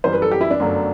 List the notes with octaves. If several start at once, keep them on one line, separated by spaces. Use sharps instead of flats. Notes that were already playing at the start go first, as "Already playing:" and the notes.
F#2 E3 G3 C5
B4
A4
G4
E4
D4
G1 F#2 F#3 A3